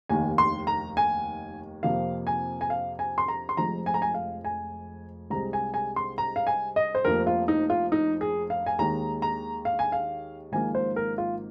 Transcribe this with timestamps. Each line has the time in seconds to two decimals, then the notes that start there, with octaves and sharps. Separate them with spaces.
0.09 F1 D#2 D#3 A#3 G#5
0.38 C6
0.67 A#5
0.97 G#5
1.83 F2 C3 F3 A#3 F5
2.27 G#5
2.61 G#5
2.70 F5
2.99 G#5
3.18 C6
3.28 A#5
3.49 C6
3.57 F1 F2 F3 G#3 A#5
3.86 G#5
3.94 A#5
4.02 G#5
4.14 F5
4.45 G#5
5.30 C2 C3 G#3 A#5
5.53 G#5
5.74 G#5
5.96 C6
6.18 A#5
6.36 F5
6.47 G#5
6.76 D#5
6.95 C5
7.05 F1 F2 F3 A#3 A#4
7.27 F4
7.48 D#4
7.70 F4
7.92 D#4
8.21 G#4
8.50 F5
8.66 G#5
8.79 D#2 D#3 G#3 A#5
9.22 A#5
9.65 F5
9.79 G#5
9.92 F5
10.52 G#1 G#2 F3 A#3 G#5
10.75 C5
10.96 A#4
11.18 F4